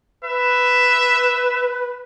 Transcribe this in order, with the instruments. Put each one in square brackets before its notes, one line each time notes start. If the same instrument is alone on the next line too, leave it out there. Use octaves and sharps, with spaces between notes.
[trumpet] B4 [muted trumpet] E5